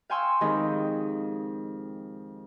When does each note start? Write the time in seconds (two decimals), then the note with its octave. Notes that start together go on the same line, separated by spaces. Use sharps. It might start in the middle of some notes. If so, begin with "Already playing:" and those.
0.10 F5 G5 G#5 C6 C#6 E6
0.41 F2 D#3 G#3 D#4 G4 B5